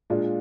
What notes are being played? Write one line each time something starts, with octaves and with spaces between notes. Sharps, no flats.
A#2 G#3 D4 F4